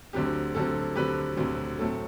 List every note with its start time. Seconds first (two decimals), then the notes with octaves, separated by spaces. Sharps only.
0.13 D2 D3 F#3 C4 G4
0.55 D2 D3 F#3 C4 A4
0.96 D2 D3 F#3 C4 G4 B4
1.37 D2 D3 F#3 C4
1.79 A2 F#3 A3 C4 A4